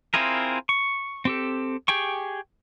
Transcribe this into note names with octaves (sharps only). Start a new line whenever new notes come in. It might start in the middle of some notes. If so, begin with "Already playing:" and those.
C4 E4 F4 G#4 A#4
C#6
C4 G4 A4
G4 G#4 G5 C#6